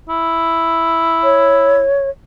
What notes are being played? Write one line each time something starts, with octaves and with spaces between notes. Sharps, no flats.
E4
C#5